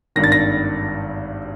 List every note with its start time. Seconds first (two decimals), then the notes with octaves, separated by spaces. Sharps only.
0.16 G#1 G2 D#3 A#6
0.24 A6
0.32 A#6